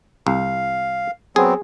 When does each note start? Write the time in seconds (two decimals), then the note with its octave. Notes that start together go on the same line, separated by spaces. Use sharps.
0.27 C2 F5
1.36 F#3 B3 C4 G#4